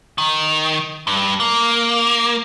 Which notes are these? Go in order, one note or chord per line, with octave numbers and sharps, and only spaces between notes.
D#3
G2
A#3